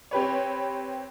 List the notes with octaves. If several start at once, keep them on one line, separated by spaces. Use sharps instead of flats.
C4 G4 B4 C#5